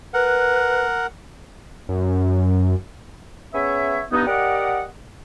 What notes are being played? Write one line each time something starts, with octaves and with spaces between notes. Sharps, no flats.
A#4 B4 F#5
F#2
B3 C#4 G#4 C#5 E5
G2 B3 D#4
G4 A#4 D5 D#5 F#5